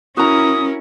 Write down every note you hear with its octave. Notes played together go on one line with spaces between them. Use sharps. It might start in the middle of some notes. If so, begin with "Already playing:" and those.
C#4 E4 F#4 A#4 A#5 D#6